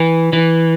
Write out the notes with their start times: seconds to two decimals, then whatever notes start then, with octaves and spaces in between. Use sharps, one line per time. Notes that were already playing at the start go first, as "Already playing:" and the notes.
Already playing: E3
0.33 E3